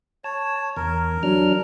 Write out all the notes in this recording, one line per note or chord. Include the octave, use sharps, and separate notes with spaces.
C#5 A5
E2 A#4
F#3 D4 F6